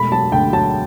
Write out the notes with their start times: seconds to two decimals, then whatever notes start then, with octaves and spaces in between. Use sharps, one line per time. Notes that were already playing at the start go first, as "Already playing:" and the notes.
Already playing: E1 A3 B5
0.12 F#3 A5
0.32 D2 G5
0.53 F#3 A5